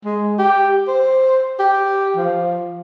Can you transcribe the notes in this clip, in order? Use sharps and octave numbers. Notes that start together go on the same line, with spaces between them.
G#3
G4
C5
G4
F3